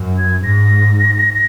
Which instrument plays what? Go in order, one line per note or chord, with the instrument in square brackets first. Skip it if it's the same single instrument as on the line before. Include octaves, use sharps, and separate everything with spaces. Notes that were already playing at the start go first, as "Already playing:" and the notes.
Already playing: [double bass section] F#2
[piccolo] G#6
[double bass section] G#2 [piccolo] A#6